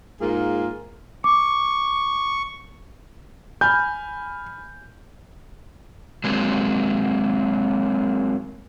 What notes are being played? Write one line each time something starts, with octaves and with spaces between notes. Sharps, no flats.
G#2 A#3 F4 G#4
C#6 D6
G#5 B5 F6 G6
F#3 G#3 A#3 C4